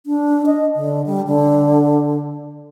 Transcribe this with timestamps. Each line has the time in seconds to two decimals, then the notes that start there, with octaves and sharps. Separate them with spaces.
0.06 D4
0.46 D#5
0.76 D3
1.06 G3
1.27 D3